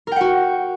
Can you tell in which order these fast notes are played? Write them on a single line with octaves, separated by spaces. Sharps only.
A#4 G5 F#5 F#4